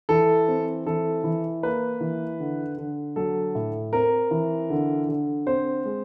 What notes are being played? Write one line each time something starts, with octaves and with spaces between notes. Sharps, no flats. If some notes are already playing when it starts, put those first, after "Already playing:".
E3 A4
C4
E3 A4
E3
A#3 B4
E3
D3
D3
F#3 A4
A2
C4 A#4
E3
D3
D3
C4 C5
G#3